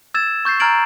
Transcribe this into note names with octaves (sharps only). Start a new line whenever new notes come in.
E6 G#6 A6 E7
C#6 G6 A6 C7
A#5 F6 G#6 A6 D7 F#7